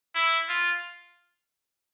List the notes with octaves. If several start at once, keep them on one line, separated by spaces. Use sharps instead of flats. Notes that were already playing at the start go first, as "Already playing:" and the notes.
E4
F4